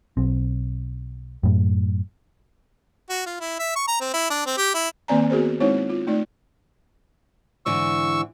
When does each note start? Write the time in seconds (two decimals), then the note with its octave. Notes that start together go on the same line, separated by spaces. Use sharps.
0.17 B1 C4
1.43 F#2 A2
3.10 F#4
3.26 F4
3.40 E4
3.59 E5
3.76 C#6
3.88 A#5
4.01 C4
4.14 E4
4.30 D4
4.46 C4
4.58 G4
4.74 E4
5.08 D#3 A#3 C4 D5 G#5 A#5
5.30 B3 F#4 G#4 A#4 C5
5.60 G#3 C4 D#4 E4 C5 C#5
5.90 F4
6.07 A3 D#4 D5
7.66 G#2 D3 E3 C#6 E6